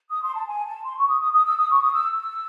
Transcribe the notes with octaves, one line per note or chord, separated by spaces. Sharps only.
D#6
C6
A5
G#5
A5
C6
C#6
D#6
D#6
D#6
E6
D#6
C#6
D#6
E6
E6